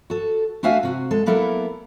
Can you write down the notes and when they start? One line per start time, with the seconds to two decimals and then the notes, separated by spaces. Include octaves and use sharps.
0.10 F#4 A4
0.63 A3 D4 F#4 E5 F5 G#5
0.83 C3 F#4
1.11 G#3 A4
1.26 F#3 A#3 B3 E4 A4 A#4